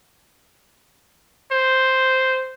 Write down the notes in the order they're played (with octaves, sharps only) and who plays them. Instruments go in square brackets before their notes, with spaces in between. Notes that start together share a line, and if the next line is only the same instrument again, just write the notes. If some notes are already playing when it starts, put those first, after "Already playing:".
[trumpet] C5